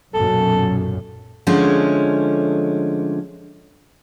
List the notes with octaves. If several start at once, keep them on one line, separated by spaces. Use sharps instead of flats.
B1 F#2 A#2 A4
D3 F3 G#3 A3 C#4